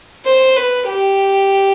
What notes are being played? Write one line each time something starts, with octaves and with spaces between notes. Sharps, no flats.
C5
B4
G4